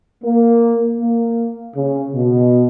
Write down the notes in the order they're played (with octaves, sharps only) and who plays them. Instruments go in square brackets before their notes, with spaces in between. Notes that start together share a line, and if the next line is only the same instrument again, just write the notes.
[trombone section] A#3
A#3
C#3
B2